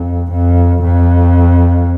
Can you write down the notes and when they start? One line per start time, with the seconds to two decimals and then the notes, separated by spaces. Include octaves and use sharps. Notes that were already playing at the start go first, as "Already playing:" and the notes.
Already playing: F2
0.32 F2
0.83 F2